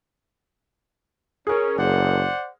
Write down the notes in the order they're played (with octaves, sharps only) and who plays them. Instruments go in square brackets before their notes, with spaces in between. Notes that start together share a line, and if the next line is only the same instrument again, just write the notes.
[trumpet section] C#4 [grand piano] G#4 A#4
[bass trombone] F#1 [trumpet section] C5 D5 F#5